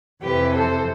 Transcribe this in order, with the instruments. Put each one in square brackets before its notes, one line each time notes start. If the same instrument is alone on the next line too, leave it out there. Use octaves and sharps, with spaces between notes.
[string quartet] F2 C3 E3 G4 B4
A4 C5